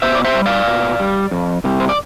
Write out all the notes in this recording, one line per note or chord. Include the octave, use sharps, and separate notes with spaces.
B2 C5 E5
D5
C5 E5
G3
D5 F5
B2
G3
F2
C3 G3
C5
D5